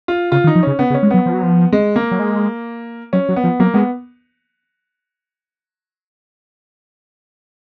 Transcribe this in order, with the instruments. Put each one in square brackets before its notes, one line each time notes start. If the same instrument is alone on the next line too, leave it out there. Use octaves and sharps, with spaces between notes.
[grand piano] F4
[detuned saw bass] C#3 [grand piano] F4
[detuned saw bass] D#3
[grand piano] D#4
[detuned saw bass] F3
[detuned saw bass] C#3 [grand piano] C#4
[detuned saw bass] C#3 [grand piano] B3
[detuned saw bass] C#3
[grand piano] C#4
[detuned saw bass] G#3
[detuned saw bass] F#3 [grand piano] B3
[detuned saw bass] F3
F#3
F3
[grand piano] G#3
A#3
[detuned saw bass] F#3
G#3
[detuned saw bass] F#3 [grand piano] C#4
[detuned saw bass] F#3
[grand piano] B3
[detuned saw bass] F3
[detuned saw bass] F#3 [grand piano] A#3
[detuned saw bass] G#3 [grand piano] B3